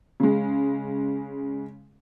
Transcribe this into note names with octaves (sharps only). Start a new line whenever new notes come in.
C#3 G#3